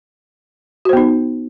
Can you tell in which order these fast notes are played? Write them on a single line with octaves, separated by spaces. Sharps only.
F#4 C5 B3 D#4